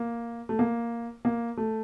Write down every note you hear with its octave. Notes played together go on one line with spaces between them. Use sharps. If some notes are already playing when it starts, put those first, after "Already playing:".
Already playing: A#3
A3
A#3
A#3
A3